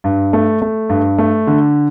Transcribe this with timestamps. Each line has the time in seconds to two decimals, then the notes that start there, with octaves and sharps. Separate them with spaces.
0.04 G2
0.33 A3
0.62 A3
0.89 G2
1.18 A3
1.47 D3